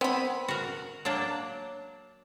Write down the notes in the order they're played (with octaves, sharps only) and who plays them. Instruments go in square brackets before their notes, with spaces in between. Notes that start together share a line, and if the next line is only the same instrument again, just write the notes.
[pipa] B3 B5 [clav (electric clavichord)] C4
[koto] F#4 A#4
F#3 A#3 D4